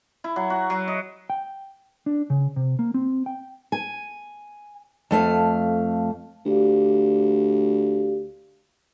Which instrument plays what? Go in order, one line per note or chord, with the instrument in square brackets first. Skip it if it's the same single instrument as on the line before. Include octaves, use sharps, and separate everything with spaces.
[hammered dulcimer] E4
F#3
F#4
F#3
D#5
[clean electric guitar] G5
D4
C#3
C3
A#3
C4
G5
[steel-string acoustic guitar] G#5
F2 A3 F5
[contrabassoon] D2 [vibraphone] G4 D5 F5